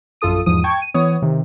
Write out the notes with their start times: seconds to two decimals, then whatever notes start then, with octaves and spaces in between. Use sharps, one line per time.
0.21 A#1 F#2 F4 A4 D#6 D#7
0.46 E2 G#2 F3 D#6 D#7
0.64 G5 A5 C#6 G#6
0.82 D#7
0.94 E3 B3 C#5 D#6
1.22 C3 D#3